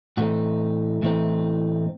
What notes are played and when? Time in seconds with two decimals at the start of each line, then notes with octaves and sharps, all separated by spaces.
0.17 A2 E3 A3 C4 D#4 F#4
1.02 A2 E3 A3 C4 D#4